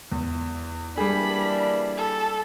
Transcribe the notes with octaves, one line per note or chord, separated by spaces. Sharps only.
E2
E3 G3 A#3 D4 G#4 B5
A4